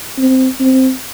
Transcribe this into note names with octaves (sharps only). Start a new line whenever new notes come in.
C4
C4